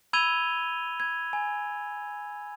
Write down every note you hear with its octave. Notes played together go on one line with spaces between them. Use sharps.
B5 E6 G#6 D#7 F7 G7
G#6
G#5